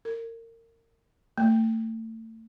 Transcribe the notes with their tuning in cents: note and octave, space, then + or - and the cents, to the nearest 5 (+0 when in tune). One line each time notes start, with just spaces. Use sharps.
A#4 -30
A3 +30